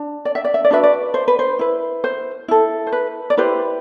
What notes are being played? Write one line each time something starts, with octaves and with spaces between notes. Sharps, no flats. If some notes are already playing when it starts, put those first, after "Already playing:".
Already playing: D4
D5
E5
D5
E5
D5
D4 F#4 B4 E5
D5
C5
B4
C5
E4 B4
C5
E4 A4
C5
B4
D5
E4 G4 B4 C5